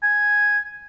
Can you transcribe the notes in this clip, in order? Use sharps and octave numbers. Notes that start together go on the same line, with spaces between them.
G#5